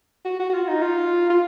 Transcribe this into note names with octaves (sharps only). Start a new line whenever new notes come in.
F#4
F#4
F#4
F4
D#4
F4
F4